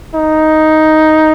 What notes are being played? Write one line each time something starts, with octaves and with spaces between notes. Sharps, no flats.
D#4